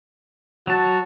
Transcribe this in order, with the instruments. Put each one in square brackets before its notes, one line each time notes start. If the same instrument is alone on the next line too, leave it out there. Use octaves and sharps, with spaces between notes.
[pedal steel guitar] F#3 A5 [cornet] F#4